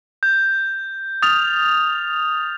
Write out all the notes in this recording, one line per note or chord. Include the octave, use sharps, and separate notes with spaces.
G6
D#6 F6 A6 F7